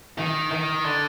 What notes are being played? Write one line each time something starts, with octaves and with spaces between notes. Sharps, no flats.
D#3
D#3
D3